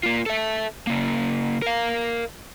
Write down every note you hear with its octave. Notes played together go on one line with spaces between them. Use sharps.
A#3 F4
A4 E5
C#3 A#3
A#4 F5